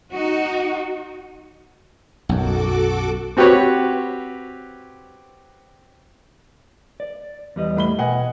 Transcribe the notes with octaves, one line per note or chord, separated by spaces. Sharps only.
D#4 F#4
B1 F#2 F#4 A4 D6
C4 F#4 G4 B4 C#5
D5
E2 G3 D#5
A2 B5 G7
B2 D#5 F#5 G#5